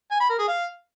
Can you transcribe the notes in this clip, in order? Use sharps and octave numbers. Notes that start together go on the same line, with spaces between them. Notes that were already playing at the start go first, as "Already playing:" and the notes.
G#5
B5
A#4
G#4
F5